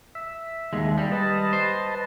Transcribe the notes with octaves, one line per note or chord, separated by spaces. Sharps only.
E5
D#2 G#3
G3
B4 D#5 A5
C5